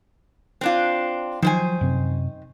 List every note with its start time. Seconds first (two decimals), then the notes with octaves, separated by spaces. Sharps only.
0.61 C4 D4 F4
1.42 D#3 F3 F#3 C5 G#5
1.81 F#2 C3